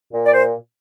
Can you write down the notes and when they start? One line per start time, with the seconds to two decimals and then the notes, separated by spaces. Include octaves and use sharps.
0.13 A#2
0.26 D5
0.33 C5